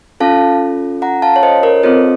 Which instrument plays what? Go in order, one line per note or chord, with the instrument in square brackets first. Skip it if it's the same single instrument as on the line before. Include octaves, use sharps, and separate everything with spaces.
[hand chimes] C#4 F4 A4 F5 A5
F#5 A#5
F5 A5
C#5
C5 D#5
A#4 C#5
C4 F4 A4 C5 D#5